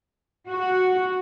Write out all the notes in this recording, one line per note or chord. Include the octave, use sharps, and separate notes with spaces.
F#4